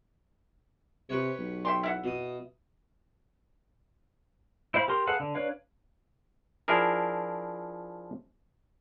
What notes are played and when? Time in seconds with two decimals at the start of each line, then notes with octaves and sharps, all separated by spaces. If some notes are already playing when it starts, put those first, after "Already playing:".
1.09 C3 G4 B4 C#5
1.38 B1
1.65 E5 G5 C6
1.83 E4 E5 F#5
2.04 B2 D#6
4.74 E4 C5 F5 B5
4.88 G4 A#4 C6
5.07 G#4 A4 B4 F5 F#5
5.20 D3
5.35 D4 B4 C#5 F5
6.68 F3 D4 E4 G#4 A#4